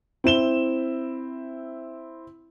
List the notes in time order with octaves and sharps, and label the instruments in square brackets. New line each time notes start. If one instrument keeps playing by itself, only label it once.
[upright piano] C4 E4 E7 G7